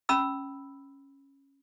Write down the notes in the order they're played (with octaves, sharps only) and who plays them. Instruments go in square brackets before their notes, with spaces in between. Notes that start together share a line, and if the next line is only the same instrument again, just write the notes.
[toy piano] C#4 B5 E6